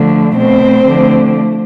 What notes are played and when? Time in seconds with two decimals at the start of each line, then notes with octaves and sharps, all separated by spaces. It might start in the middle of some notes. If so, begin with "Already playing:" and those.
Already playing: D3 F3 A3
0.36 B2 A3 C4 C5
0.87 D3 F3 A3